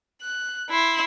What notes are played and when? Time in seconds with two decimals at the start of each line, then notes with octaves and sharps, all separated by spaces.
0.22 F#6
0.70 E4 C6